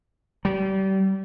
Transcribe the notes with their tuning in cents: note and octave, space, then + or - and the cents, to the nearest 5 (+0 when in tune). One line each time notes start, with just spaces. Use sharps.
G3 -30